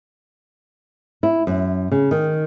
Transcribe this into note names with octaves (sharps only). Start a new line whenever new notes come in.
E4
F#2
C#3
D#3